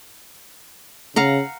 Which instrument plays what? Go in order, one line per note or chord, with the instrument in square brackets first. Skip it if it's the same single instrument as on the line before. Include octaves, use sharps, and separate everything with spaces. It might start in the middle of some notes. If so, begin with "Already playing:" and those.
[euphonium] C#3 [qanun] F5 F#5 A#5